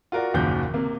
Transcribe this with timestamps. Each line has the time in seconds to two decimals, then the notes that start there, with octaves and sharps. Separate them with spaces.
0.12 F4 F#4 A#4 D5 F#5
0.34 F#1 D#2 A#2 F3 F#4 G6
0.74 C3 A#3